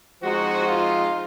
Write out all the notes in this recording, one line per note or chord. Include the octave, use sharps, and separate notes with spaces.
F3 G#3 C4 D#4 F#4
F4